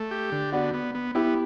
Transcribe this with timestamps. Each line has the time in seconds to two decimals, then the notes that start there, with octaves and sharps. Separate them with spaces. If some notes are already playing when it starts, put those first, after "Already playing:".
Already playing: A3
0.11 G4
0.32 D3
0.52 B3 D4 F#4
0.74 B3
0.95 B3
1.15 B3 E4 G4